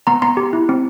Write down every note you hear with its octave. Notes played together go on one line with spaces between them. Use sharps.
B3 A#5 C6
B3 A#5 C6
G4
E4
C4